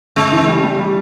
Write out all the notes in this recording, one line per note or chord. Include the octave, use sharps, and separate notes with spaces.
C#3 G#3
E3
G3
G3
G3